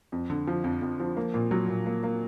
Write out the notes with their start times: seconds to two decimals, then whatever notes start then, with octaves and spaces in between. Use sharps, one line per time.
0.12 F2
0.30 D3
0.47 F3
0.64 F2
0.82 F2
1.00 F3
1.17 A#3
1.34 A#2
1.51 F#3
1.68 A#2
1.86 A#3
2.03 A#3